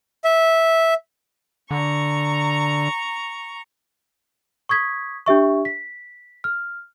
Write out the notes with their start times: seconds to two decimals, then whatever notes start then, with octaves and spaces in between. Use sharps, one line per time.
0.24 E5
1.71 D3 A#5 C#6
4.69 C#6 D#6 G#6 B6
5.26 D4 G4 E5 C#6
5.65 B6
6.44 F6